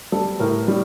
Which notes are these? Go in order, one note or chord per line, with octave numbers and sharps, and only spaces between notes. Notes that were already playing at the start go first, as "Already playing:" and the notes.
G3 A4
A2 A#4
G3